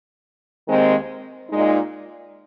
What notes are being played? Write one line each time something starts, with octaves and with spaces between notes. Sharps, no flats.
D#2 D#3 G#3 C4 D#4
A#2 G#3 D#4